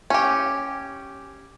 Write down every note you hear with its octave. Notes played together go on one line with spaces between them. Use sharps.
C#4 G4